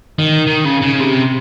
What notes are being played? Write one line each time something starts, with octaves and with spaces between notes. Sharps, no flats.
D#3
D#3
C#3
C#3
C3